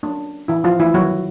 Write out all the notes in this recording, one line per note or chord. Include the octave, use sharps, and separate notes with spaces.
F#3 A#3 C#4 D4
E3 E4
F3 F4
E3 E4
D#3 F#3 G3 B3 F#4